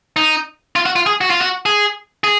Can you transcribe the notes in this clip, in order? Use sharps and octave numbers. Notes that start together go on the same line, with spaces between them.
D#4
F4
F#4
F4
G#4
F#4
F4
F#4
G#4
G#4